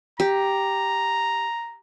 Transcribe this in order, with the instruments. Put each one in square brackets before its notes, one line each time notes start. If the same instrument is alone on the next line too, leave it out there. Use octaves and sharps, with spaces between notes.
[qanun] G4 [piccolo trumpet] A#5